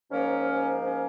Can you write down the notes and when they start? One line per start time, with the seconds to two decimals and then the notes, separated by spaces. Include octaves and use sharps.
0.11 G#2 F3 A#3 C#4
0.85 C#4